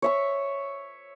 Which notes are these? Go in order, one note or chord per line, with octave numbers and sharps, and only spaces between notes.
C#5 E5 C#6